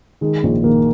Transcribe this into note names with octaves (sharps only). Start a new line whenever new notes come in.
D#3 G#3
A#1
D#3 A#3